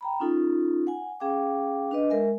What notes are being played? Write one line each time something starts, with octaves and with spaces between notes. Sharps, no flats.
G5 A#5 B5
C#4 D#4 F4 A4
F#5 G#5
C#4 G#4 F5 G5 D6
D4 B4 D#5
G#3 A#4 E5 G#5